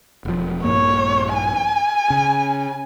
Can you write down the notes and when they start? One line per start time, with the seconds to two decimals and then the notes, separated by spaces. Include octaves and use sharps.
0.25 E1 F3
0.64 A#1 G2 A#3 C#5
1.35 G#5
2.10 C#3